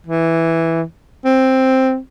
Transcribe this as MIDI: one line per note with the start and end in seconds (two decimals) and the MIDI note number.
0.07 0.84 52
1.25 1.98 60